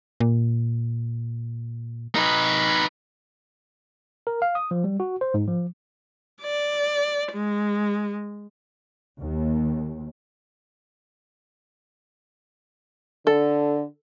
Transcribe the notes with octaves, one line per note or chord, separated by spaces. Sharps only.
A#2
D#4 B4
A#4
F5
D#6
F3
G3
F#4
C5
G#2
F3
D5
G#3
D#2
D3 A4